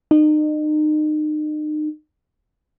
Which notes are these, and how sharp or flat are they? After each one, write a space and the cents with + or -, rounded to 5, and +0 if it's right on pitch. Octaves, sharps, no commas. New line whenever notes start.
D#4 -35